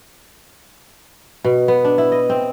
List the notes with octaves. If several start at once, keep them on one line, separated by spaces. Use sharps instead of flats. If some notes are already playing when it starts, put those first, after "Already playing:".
B2
B3
D4
E4
D#5
C4